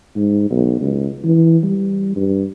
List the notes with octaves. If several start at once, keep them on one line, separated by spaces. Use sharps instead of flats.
G#2
B1
C#2
E3
G3
G2